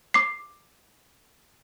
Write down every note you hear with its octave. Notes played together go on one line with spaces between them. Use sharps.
D6 C7